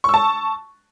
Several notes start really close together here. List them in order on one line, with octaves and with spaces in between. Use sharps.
C#6 E6 A5